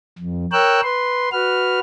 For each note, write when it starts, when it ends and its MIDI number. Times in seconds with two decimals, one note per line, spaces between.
0.18 0.45 41
0.52 0.81 70
0.52 0.81 73
0.52 0.81 79
0.52 0.81 88
0.52 0.81 90
0.84 1.29 71
0.84 1.29 84
1.32 1.80 66
1.32 1.80 71
1.32 1.80 89